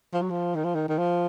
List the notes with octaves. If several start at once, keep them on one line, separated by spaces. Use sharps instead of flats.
F3
F#3
F3
D#3
F3
D#3
D#3
F3